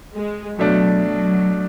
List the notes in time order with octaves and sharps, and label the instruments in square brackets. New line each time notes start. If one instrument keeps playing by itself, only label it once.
[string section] G#3
[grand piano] B2 A3 D4 [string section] F#3
[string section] F#3